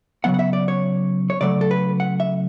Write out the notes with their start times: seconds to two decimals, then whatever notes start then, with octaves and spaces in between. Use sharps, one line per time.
0.24 C#3 F#3 B3 F#5
0.34 F#5
0.39 E5
0.53 D5
0.68 C#5
1.30 C#5
1.41 C#3 F#3 A3 D5
1.61 A4
1.71 B4
2.00 F#5
2.20 E5